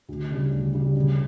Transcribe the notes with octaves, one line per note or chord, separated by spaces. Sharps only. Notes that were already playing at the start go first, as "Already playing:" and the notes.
D2
C#3 G3
D2
C#3 G3
C#3